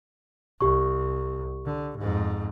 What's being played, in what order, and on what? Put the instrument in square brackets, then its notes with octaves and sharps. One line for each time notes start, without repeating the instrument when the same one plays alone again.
[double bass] C2 [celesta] G4 C#6
[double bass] D3
F2 G#2